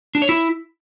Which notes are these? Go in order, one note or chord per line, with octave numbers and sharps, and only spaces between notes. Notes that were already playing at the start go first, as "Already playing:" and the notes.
D4
C#5
E4